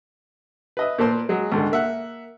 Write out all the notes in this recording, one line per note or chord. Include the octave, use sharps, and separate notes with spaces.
B4 D#5 E5
A#2 A#3 A4 B4 C5 C6
F#3 G#3
C#2 G#2 D3
A#3 E5 F#5